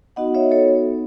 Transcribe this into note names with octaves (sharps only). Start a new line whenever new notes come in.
B3 D#4 F#4 D#5 F#5
C#5 E5
A4 C#5